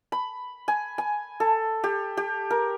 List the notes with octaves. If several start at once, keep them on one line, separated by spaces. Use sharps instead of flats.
B5
G#5
G#5
A4
G4
G4
A#4